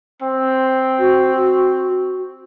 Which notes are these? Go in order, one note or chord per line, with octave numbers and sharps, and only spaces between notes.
C4
F#4